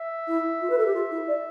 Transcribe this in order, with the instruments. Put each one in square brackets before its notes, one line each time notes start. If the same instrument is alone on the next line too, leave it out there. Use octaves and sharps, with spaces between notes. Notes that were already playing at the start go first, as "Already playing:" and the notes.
Already playing: [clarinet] E5
[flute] E4
F4
B4
A4
G4
F4
E4
D5